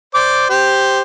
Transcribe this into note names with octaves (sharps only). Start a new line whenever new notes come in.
C5 D5 D6
G4 C5